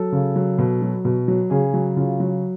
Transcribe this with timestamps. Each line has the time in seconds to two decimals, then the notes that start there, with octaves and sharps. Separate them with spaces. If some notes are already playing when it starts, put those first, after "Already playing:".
Already playing: F#3 A4
0.12 C#3
0.36 F#3
0.59 B2
0.82 F#3
1.05 B2
1.28 F#3
1.50 C#3 G#4
1.74 F#3
1.96 C#3 F4
2.20 F#3